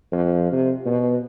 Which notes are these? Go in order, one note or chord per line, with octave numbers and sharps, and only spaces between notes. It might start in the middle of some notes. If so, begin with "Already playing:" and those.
F2
C3
B2